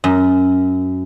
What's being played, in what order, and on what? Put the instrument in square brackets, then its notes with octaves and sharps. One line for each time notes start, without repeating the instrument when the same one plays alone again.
[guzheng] F#2